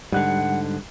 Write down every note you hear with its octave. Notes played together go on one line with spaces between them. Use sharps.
G#2 D3 G3 F#5 F#6